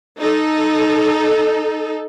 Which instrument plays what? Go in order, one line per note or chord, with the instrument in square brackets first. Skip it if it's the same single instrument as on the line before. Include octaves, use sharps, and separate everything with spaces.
[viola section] D#4 A4